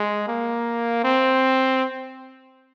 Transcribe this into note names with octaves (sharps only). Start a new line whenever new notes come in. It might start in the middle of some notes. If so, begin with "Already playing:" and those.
Already playing: G#3
A#3
C4